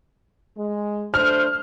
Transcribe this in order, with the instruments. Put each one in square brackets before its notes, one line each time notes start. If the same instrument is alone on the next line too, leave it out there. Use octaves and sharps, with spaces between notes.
[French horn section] G#3
[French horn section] A3 D4 C5 [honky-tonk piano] F6